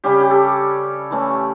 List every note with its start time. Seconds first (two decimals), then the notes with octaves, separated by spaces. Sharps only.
0.04 C#3 G3 C#4 G4
0.21 G4
0.31 A4
1.11 E3 A3 C#4